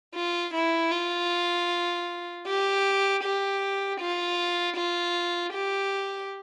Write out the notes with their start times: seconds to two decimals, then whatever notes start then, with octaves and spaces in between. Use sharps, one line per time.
0.15 F4
0.54 E4
0.91 F4
2.47 G4
3.23 G4
4.00 F4
4.76 F4
5.53 G4